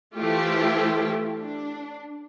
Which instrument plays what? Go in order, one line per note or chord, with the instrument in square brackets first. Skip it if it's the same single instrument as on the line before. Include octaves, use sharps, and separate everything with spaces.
[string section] E3 A3 E4 F4 G4 C5
D4